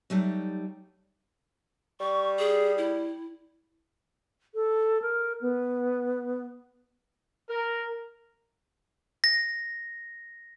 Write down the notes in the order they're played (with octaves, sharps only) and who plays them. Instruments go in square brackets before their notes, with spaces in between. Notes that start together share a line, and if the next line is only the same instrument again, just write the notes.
[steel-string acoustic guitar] F#3 G3 A3 D#4
[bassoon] G3 [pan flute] C#6
[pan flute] G#4
E4
[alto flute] A4
A#4
B3
[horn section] A#4
[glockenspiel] A#6